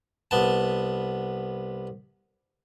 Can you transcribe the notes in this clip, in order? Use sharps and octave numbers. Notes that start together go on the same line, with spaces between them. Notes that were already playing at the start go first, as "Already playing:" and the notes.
C2 B3 A5